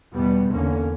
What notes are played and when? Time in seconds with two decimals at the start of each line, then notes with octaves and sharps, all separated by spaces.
0.13 E2 B2 G3 B3
0.51 E2 D3 A#3 C#4